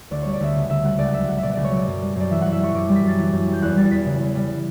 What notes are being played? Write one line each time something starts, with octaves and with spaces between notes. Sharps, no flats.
D2 D5
G3 C#5
D5
D2 E5
C#3
D2 E5
G3 F#5
C#2 D5
F#5
F#3 E5
C#2 F#5
B2 D5 E5
C#2 D5
C#5
F#3 D5
F#2
G3
F#2 D5
E3 E5
F#2 F#5
E5
G3 C#6
F#2 D6
G3
B6
F#2 A6
E3
F#2
G3 G6
E2 F#6
G3 A6
E2 B6
C#3
E2
G3